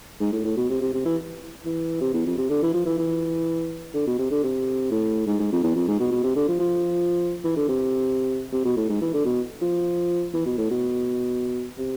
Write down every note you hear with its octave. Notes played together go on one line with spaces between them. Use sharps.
G#2
A2
A2
B2
C3
C3
C3
E3
E3
C3
E2
F2
C3
D3
E3
F3
E3
E3
D3
B2
C3
D3
C3
A2
G#2
G#2
F2
E2
F2
G#2
B2
B2
C3
D3
F3
F3
E3
D3
C3
C3
B2
A2
G#2
E3
D3
B2
F3
E3
B2
A2
B2
C3